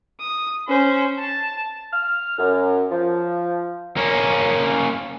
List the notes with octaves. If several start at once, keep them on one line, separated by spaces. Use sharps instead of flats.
D#6
C#4 C5
A5
F6
F#2
F3
A#3 C#4